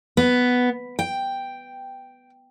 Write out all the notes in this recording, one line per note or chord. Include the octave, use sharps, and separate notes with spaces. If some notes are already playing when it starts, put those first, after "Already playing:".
B3
G5